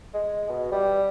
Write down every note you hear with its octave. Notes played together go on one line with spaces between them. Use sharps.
G#3
B2
G3